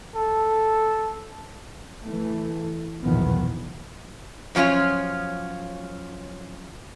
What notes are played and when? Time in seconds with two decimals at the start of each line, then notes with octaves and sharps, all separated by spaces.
0.15 A4
2.03 E3 A3
3.03 B1 E2 A#2 D#3 F3 B3
4.55 F#2 F3 C#4 F4 C#5